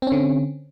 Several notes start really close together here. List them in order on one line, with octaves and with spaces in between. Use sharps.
C4 C#4 D3